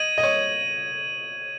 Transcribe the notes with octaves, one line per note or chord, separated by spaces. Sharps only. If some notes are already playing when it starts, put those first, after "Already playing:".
Already playing: D#5 G#6 D#7 F#7
D#5
C#5